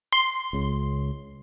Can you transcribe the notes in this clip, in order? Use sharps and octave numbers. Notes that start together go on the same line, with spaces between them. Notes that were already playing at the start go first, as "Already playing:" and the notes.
C6
C#2 C#3